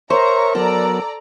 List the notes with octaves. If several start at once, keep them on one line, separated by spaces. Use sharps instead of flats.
A#4 C5 C#5 E5 A#5 C#6
F#3 B3 A4 D5 A#5